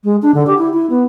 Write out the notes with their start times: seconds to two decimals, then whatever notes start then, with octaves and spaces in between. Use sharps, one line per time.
0.04 G#3
0.22 D4
0.34 D3
0.47 G4
0.58 E4
0.73 E4
0.90 B3